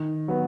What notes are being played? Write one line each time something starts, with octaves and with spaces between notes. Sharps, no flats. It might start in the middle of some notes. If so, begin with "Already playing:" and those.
Already playing: D#3
F#3 B3